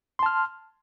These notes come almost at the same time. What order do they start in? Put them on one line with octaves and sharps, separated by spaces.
C6 A5 F6